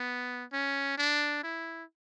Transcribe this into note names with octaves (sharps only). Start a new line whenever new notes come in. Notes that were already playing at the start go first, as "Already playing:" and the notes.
Already playing: B3
C#4
D4
E4